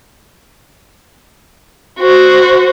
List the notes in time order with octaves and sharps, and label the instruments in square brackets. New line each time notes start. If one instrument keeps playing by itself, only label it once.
[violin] F#4 C5